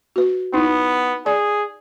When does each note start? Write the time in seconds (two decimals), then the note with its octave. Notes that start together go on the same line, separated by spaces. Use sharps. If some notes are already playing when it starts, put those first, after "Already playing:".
0.16 F#4 B4
0.53 B3 D#4 E4
1.26 G#4 D5